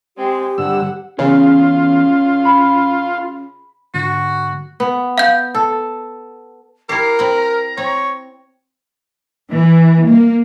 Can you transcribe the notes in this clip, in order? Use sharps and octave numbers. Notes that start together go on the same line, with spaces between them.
G#3 C4 G4
G2 D3 F#5 E6
E2 C#3 C#4 F4
B5
G#2 D3 F#4
B3
F5 G6
A4
E4 G4 A#4 C7
C4 G5 B5
A#5
C4 C#5
E3
A#3